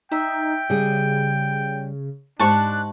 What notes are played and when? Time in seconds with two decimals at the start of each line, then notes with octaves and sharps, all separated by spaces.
0.12 D#4 E5 G5
0.70 C#3 G3 G#4
2.39 G#2 D4 G4 C5 A5 C#6 F#6